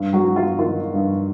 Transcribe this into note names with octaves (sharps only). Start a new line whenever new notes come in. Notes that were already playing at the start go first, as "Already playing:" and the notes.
Already playing: G2
F#3 F#4
F#3
F4
D#3 F4
G2